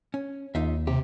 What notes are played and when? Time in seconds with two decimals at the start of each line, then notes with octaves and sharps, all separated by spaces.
0.14 C#4
0.55 D#2 D#4 F4 E5
0.87 C3 G4